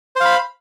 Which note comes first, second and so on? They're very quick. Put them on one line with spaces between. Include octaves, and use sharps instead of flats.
C5 F5 B5